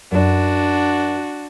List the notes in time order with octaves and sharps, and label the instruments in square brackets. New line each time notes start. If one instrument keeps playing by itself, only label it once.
[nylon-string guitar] F#2 D5 [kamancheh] D4 F#4